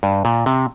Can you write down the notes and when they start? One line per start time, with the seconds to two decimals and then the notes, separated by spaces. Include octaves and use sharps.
0.03 G2
0.25 A#2
0.46 C3